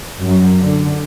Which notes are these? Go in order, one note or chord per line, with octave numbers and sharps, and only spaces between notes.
F#2
D3